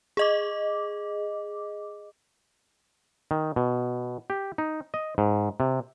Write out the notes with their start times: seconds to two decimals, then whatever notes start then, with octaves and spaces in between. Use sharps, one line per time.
0.17 G#4 D#5 D6
3.31 D#3
3.56 B2
4.30 G4
4.58 D#4
4.94 D#5
5.18 G#2
5.60 C3